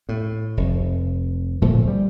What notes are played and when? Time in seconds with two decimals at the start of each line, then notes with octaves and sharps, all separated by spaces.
0.09 A2
0.57 F1
1.62 D1 A#2 F3 A3
1.88 G3